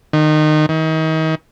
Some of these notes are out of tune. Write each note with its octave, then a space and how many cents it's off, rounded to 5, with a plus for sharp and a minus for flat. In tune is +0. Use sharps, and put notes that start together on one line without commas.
D#3 -25
D#3 +35